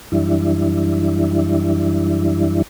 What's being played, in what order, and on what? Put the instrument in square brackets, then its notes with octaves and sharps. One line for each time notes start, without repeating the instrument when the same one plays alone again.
[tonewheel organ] F#2 E3 G3 D4 E4